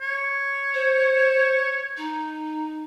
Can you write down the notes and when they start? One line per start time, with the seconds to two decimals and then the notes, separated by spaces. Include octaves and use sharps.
0.01 C#5
0.74 C5
1.97 D#4